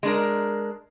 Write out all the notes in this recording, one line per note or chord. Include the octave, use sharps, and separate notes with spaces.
G#3 D4 A#4